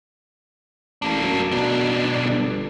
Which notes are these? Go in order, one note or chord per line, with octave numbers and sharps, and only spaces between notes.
A1 A#3 D4
F#2
B1 B2 D4
G1